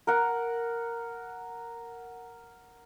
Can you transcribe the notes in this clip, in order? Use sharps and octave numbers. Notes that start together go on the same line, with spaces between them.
A#4 F#5